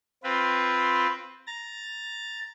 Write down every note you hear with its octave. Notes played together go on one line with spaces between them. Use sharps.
C4 F4 B4
A#5 A6